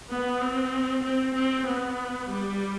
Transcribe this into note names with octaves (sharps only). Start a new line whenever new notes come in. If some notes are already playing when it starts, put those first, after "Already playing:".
B3
C4
C4
C4
B3
G3